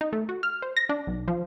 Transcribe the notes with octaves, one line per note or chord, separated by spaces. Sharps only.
D#4
A3
F#4
F6
C5
A#6
D4
B1
F3